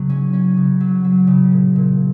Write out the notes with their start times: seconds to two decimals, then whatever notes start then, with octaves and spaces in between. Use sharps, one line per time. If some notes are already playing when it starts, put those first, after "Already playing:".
Already playing: C#3 F#3
0.09 C#4
0.33 C#4
0.57 C#3
0.80 F#3
1.04 F#3
1.27 C#3
1.52 A#2
1.76 A#2